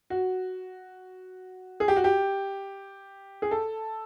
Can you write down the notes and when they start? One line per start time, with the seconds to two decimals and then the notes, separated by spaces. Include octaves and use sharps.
0.10 F#4
1.80 G#4
1.88 G4
1.96 F#4
2.04 G4
3.42 G#4
3.51 A4